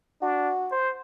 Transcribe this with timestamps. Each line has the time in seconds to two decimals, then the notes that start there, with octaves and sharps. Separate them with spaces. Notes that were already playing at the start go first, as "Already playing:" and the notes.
0.22 D4 F#4
0.72 C5